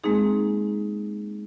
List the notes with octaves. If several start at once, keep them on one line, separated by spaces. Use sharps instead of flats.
G#3 A#3 C4 D#4 G#4